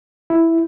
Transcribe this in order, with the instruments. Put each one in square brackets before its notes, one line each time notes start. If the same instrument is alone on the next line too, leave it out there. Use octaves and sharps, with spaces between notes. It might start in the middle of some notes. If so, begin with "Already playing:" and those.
[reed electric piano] E4